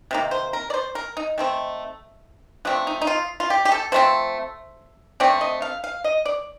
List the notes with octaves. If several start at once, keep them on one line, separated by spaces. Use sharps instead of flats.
C3 D#3 A#3
C5
A#4
D5
C5
A#4
D#4
D#3 A3 C4
F3 A3 C4 D4
D#4
D#4
F4
F4
G4
G4
A4
F3 A3 C4 C5
D3 A3 C4 D5
D#5
F5
F5
D#5
D5